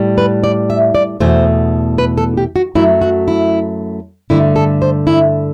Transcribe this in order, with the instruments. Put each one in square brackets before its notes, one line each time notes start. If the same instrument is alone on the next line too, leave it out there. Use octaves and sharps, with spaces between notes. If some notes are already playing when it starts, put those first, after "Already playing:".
Already playing: [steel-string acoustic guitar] A2 G3
B4
D5
E5
D5
E2 B2 A3 C5
B4
A4
G4
F#4
F#2 F#3 A3 E4
F#4
E4
G2 D3 A3 E4
A4
C5
E4